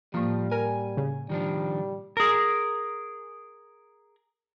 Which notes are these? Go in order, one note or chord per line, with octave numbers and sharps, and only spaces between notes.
A2 F3 G3 A#3 F4
A#4 G#5
C#3
D#3 F3 G3 D4
G#4 A#4